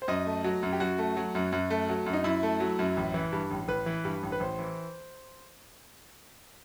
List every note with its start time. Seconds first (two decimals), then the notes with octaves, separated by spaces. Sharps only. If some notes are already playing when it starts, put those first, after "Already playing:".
0.02 C5
0.08 F#2 D#5
0.27 A3
0.44 F#3
0.63 F#2
0.72 G4
0.80 F#2 F#4
0.98 A3
1.17 F#3
1.35 F#2
1.52 F#2
1.70 A3
1.89 F#3
2.06 F#2
2.13 D#4
2.24 F#2 E4
2.43 A3
2.60 F#3
2.79 F#2
2.97 A1
3.14 E3
3.32 G2
3.51 A1
3.68 A1 B4
3.86 E3
4.05 G2
4.23 A1
4.32 B4
4.40 A1 C5
4.59 E3